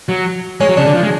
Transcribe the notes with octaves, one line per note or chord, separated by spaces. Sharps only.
F#3
G#3 C#4
F#3
C#3 D4
D3
F3
G#3